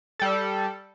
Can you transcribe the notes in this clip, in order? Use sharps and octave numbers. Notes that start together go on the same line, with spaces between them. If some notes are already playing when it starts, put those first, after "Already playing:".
G3 A4